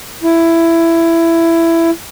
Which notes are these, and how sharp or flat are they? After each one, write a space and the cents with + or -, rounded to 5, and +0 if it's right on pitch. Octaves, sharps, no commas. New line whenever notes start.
E4 +15